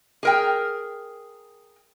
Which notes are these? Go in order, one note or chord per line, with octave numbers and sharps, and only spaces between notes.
G#4 A#4 G5